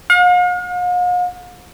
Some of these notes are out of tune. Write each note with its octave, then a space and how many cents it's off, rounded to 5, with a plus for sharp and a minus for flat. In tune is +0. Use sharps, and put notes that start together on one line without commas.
F5 +45